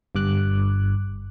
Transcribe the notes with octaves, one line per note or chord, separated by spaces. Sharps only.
G1 G2 D6 F#6